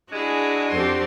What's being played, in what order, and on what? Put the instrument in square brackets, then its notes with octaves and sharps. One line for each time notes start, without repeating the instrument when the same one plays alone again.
[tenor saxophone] G#3 [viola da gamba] D4 F#4 [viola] E4 G#4
[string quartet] F2 C4 A4 [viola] G4 C6